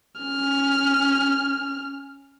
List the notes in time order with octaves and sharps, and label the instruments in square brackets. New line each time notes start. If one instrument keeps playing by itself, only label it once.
[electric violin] C#4 F6